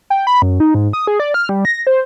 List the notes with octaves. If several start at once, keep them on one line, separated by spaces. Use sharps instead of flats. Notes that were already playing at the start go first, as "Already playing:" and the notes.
G5
B5
F#2
D#4
G#2
D#6
G#4
D5
F6
G3
A#6
C5